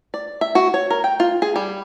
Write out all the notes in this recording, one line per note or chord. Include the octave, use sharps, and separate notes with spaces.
D5
E5
F#4
C#5
A#4
G5
F4
G#4
G3